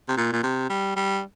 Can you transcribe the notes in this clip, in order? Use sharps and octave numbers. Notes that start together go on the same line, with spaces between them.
C3
A#2
A#2
C3
G3
G3